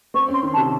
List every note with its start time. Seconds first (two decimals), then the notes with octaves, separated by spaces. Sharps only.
0.14 C4 C#6
0.28 C#4 C6
0.43 D#3
0.53 A5
0.57 C3